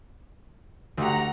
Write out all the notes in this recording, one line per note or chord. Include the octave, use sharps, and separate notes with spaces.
D2 G4 F#5 A#5